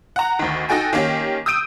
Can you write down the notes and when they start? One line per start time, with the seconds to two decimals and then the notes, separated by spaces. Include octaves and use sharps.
0.16 F#5 A#5
0.39 D2 D#3
0.69 D#4 F#4 A4 G5 G#5
0.93 D#3 A#3 C#4 G4
1.46 D#6 E6 G6 D7 D#7